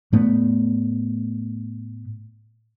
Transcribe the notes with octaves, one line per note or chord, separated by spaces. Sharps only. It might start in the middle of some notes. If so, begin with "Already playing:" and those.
A2 A3 B3